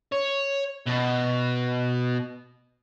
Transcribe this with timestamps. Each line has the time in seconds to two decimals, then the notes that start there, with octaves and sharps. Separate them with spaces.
0.12 C#5
0.87 B2